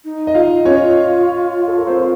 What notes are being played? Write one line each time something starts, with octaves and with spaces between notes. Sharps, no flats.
D#4
D#5
F4 F5
C#4 F4 C#5
A4
A#4
C4 C5